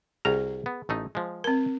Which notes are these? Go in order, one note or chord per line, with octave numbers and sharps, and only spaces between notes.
C2 F#4 G#4 A#5
B3
A1 A3 D#4
F3 G#3
C4 A#4